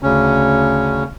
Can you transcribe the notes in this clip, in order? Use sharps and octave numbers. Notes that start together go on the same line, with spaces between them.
D2 C#3 C#4